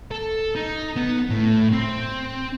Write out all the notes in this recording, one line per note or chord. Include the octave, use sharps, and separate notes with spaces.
A4
D#4
B3
A2
C4